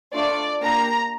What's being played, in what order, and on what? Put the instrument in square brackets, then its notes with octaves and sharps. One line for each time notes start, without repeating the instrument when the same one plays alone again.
[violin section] A3 D4 F4 A4 D5
A#3 D4 G4 A#5